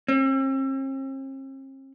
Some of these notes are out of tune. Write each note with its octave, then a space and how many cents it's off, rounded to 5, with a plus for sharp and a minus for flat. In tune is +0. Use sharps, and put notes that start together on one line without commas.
C4 +45